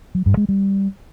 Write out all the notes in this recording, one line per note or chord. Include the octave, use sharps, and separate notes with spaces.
F#3
G2
G#3
G3